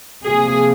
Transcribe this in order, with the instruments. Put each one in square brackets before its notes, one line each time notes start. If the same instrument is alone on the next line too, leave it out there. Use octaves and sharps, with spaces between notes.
[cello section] C3 F3 A#3 G#4